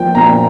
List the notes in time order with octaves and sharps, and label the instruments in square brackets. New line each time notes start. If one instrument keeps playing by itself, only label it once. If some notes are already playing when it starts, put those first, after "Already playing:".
Already playing: [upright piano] F3 A#3 G5
A#2 A#5